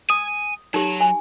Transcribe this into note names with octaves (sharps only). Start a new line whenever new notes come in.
G#5 D#6
F#3 D#4 G4
G#5